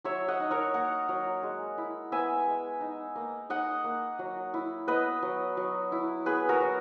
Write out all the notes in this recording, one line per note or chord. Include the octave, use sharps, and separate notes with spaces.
F#3 C#5 E5
D#5 F#5
D#4
A#4 C#5
A#3 F#5 A#5
F#3
G#3
E4
B3 E5 G#5
G#3
D#4
A#3
D#4 D#5 F#5
A#3
F#3
E4
B3 B4 D#5
F#3
F#3
E4
B3 G#4 B4
F#4 A#4
F#3